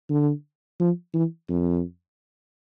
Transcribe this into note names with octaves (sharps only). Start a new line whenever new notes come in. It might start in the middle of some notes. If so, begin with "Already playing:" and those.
D3
F3
E3
F2